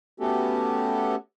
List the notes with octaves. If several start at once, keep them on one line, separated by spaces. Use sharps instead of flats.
A3 B3 C#4 F#4 G4 A4